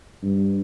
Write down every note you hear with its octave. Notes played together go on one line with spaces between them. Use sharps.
G2